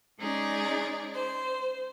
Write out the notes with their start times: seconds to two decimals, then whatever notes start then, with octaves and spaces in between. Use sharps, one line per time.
0.19 G#3 C#4 D#4 G#4 D5
1.13 C5